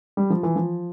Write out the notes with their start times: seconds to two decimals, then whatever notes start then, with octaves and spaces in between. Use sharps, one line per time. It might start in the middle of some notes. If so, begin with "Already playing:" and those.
0.17 G3
0.30 F3
0.43 E3
0.56 F3